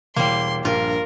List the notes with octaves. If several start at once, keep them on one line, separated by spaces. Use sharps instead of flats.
E1 G3 A#3 C6
A#1 G2 F4 A#4